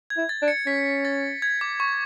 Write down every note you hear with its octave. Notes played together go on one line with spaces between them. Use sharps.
G#6
E4
A6
D4
C#7
C#4 B6
A6
G#6
D6
C#6